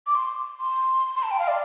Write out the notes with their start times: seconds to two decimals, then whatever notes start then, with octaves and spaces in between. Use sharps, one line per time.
0.07 D6
0.15 C6
0.60 C6
1.16 C6
1.23 A5
1.31 G5
1.39 F5
1.48 D5